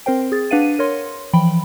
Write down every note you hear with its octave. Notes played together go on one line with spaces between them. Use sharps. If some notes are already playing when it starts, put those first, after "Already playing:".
C4 A#4 C5 G5
G#4 A6
D4 B4 F5 F#5 D#7
A#4 C#5 C6
E3 F3 G5 B5